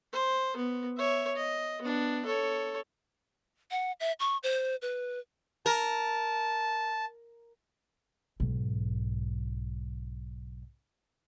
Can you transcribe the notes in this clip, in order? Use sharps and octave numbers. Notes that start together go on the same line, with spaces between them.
C5
B3
C#5 E5
D#5
B3 D4
A4 C#5
F#5
E5
C#6
C5
B4
A#4 A5
B1 G#2